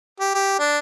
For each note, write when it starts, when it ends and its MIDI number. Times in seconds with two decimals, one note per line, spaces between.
0.20 0.31 67
0.35 0.59 67
0.59 0.78 62